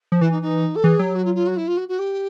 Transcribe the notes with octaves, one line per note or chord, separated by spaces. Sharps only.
F3
E3 E4
D#4
D#4
A4
E3 G#4
F#3 G4
F#4
F4
F4
F#4
E4
F4
F#4
F#4
G4